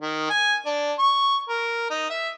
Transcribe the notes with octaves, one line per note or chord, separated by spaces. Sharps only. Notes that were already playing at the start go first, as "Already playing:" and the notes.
D#3
G#5
D4
C#6
A#4
D#4
E5